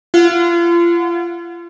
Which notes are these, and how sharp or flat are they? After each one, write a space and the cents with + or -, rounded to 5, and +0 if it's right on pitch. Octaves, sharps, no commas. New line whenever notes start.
F4 -35 F#5 -35